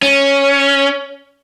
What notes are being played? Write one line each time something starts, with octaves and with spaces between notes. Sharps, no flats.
C#4